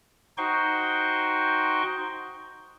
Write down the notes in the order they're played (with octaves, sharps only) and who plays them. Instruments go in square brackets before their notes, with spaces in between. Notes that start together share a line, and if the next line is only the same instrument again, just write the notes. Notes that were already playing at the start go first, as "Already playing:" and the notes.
[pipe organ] D#4 F#4 C5 G5 C6 C#6